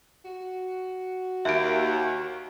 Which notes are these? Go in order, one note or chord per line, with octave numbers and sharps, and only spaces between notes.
F#4
D#2 E5 D7